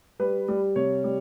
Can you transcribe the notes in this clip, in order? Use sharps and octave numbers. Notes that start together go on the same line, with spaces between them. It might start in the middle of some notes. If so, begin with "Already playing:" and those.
G3 B4
G3
C3 C#5
G3